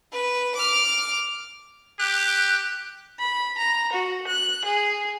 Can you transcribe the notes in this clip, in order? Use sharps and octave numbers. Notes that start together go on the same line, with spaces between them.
B4
D6 F6
G4 F#6
B5
A#5
F#4
F#6
G#4